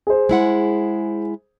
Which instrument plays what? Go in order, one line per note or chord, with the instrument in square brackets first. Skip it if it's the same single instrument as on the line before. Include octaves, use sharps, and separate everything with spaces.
[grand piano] G#4 C5
[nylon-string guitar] G#3 E4 F#5